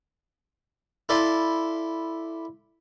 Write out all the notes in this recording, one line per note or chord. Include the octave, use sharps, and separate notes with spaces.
E4 A4 D5 F5 B5 C6